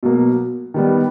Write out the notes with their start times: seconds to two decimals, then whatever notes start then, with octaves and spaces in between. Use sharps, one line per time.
0.03 B2 F#3 A#3
0.74 D#3 G3 B3